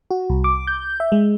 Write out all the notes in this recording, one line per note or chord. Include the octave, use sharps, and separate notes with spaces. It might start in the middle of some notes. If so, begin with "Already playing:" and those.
F#4
C2
D6
G6
E5
G#3